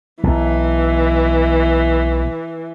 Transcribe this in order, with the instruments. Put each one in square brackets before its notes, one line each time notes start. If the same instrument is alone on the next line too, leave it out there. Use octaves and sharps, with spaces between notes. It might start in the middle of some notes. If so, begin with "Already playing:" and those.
[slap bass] B1 [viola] E3